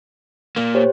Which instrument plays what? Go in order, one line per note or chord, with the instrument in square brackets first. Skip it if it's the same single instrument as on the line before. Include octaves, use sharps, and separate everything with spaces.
[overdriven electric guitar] A#2 A#3
[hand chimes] G4 C5 C#5